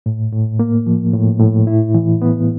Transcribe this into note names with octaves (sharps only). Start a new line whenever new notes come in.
A2
A2
A#3
F3
A2
A2
E4
E3
B3